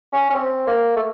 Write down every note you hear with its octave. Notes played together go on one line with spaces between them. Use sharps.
C#4
C#4
C4
A#3
A3